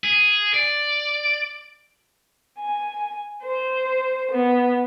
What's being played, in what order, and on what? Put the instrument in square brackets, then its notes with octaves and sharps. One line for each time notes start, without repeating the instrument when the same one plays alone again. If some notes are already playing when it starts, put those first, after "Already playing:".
[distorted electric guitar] G#4
D5
[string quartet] G#5
C5
B3